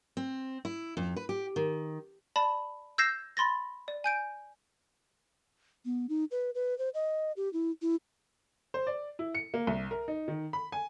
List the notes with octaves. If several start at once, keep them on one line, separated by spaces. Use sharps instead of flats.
C4
E4
F2
B4
G4
D#3
D5 A5 B5
E6 G6 G#6 A#6 C7 E7
B5 C6 A6 A#6
D5
G#5 G6 D7
B3
D#4
B4
B4
C5
D#5
G4
E4
E4
C5
D5
E4
C#7
A#3
C2
A#4
D#4
D#3
B5
G#5